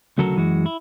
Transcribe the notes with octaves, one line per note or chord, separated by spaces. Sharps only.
D2 C#3 F#3 F#4 A4 A#4
F#2 E3 G#3 F#4
E4